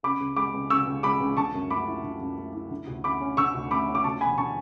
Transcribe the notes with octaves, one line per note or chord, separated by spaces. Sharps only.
C#3 B5 D6
C#2
G#3 B5 D6
C#2
C#3 C#6 E6
C#2
G#3 B5 D6
C#2
D3 A5 C#6
F#2
A3 B5 D6
E4
D3
F#2
A3
E4
D3
D2
A3 B5 D6
C#4
D3 C#6 E6
D2
A3 B5 D6
C#4
D6
D2 A5 C#6
E1 G#5 B5
D3 A5 C#6